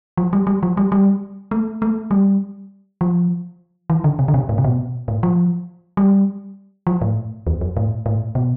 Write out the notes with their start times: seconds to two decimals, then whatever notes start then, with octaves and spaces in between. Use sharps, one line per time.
0.17 F3
0.33 G3
0.47 G3
0.63 F3
0.77 G3
0.92 G3
1.51 A3
1.82 A3
2.11 G3
3.01 F3
3.90 E3
4.04 D3
4.19 C3
4.28 D3
4.34 C3
4.49 A2
4.58 C3
4.64 B2
5.08 A2
5.23 F3
5.97 G3
6.87 F3
7.02 A2
7.47 E2
7.61 F2
7.77 A2
8.06 A2
8.35 B2